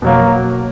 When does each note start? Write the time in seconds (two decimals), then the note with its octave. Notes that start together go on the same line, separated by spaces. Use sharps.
0.02 B2 F#3 A#3